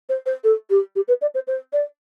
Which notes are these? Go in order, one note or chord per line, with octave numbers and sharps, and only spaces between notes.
C5
C5
A4
G4
G4
B4
D5
C5
C5
D5